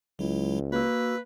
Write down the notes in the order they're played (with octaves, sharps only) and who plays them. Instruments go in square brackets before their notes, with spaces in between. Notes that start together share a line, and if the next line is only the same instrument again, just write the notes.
[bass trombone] C#2 [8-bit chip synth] F#3 G#3 E4
[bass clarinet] A#3 [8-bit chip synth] F#4 E6 [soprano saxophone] B4